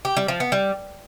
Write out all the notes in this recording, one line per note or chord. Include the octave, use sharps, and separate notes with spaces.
G4
G3
F3
B3
G3